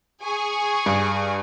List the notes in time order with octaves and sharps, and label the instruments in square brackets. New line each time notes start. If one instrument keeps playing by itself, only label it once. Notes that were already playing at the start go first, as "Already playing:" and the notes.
[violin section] G#4 G#5 C#6
[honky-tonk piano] G2